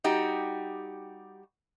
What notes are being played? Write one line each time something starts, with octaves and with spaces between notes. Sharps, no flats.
G3 D#4 F#4 G4